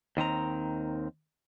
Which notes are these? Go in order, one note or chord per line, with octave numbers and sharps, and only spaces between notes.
D#2 D#3 C4 A#5